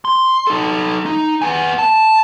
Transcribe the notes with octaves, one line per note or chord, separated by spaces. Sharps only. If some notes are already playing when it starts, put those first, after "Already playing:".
C6
D#4 A4
D#4
B3 G#5
A5